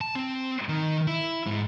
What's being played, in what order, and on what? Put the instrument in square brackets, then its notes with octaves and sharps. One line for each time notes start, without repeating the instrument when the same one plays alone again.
[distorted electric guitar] A5
C4
D#3
E4
G#2